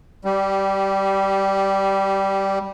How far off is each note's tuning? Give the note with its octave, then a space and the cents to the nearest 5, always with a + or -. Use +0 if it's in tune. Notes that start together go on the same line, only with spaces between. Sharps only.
G3 -5 G4 -25